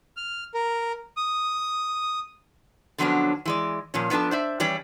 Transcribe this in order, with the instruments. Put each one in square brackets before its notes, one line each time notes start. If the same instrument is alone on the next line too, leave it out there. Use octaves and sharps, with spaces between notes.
[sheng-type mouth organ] F6
A#4
D#6
[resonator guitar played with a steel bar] D3 F3 F#3 B3 C#4 D4
E3 G#3 D5
A#2 F3 C#4
F3 B3 D4 A4 A5
C5 D5 E5
E3 G3 C#4 G4 D5